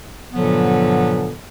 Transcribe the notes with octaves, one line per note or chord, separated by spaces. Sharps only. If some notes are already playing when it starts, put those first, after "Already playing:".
G2 A#2 D3 F3 F#3 B3